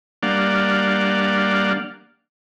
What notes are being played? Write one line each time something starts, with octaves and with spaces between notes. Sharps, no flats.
G3 A#3 D4 D5 F5 F#5